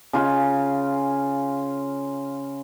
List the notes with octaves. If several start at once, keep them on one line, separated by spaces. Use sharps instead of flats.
C#3 F4 G#5